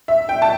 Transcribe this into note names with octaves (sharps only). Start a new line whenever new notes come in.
E5
G5
A5